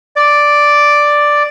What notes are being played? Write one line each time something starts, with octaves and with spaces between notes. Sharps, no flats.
D5